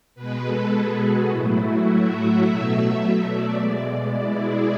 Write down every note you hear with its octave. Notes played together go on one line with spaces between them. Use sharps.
B2 G#3 B4
A4
G#4
F#4
A2 F#3 A3 E4
F#4
E5
E5
B2 F#3 A3
E5
D5
B2 G#3 D5
E4
G#4